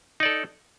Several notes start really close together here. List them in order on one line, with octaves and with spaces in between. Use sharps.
D#4 D5 A4